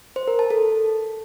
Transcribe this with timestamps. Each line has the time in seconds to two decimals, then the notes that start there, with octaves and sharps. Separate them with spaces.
0.16 C5
0.28 A#4
0.39 A5
0.50 A4